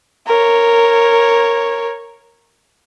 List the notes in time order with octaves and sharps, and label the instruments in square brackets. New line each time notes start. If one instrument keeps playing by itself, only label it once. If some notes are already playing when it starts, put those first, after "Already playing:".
[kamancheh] A#4 C#5